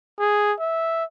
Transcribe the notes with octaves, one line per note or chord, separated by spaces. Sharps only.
G#4
E5